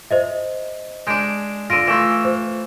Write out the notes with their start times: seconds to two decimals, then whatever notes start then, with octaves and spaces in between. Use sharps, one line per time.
0.11 C5 D#5 E5
1.07 G#3 D4 G6 D7
1.70 D3 F4 A#6 D7 D#7
1.87 E3 A3 F4
2.25 C5